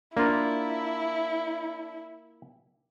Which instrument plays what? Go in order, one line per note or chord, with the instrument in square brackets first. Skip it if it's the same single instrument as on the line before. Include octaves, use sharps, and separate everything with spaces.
[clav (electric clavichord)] A#3 F4 [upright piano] D4 [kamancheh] E4